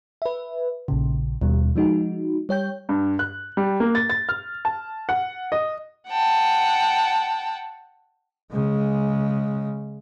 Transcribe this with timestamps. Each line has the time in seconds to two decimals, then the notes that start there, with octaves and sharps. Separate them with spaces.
0.22 B4 E5
0.88 A#1 A#2 C#3
1.42 D#2 B2 G3
1.76 F3 G#3 D#4 F#4
2.49 G3 C#5 G5 G6
2.89 G2
3.19 F#6
3.57 G3
3.80 A#3
3.95 A6
4.10 A6
4.29 F6
4.65 A5
5.09 F#5
5.52 D#5
6.08 F#5 G5 A5
8.52 C#3 G#3